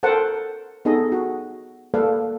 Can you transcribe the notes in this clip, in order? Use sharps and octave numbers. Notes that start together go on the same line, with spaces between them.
A4 A#4 C5 F#5 G5 A5
B3 D#4 G#4 A4 D#5
F#4
A#3 A4 B4 D5 F5